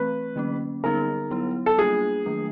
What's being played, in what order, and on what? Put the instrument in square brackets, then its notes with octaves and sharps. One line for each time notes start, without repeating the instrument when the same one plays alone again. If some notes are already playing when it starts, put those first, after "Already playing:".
Already playing: [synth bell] E3 A3 C4 [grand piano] B4
[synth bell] D3 F#3 A#3 C#4
[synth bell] D3 G3 B3 D#4 G#4 [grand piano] A#4
[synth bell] F#3 B3 E4
[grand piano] A4
[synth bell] G3 A#3 D4 F4 [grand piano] G#4
[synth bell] D#3 F#3 A3 D4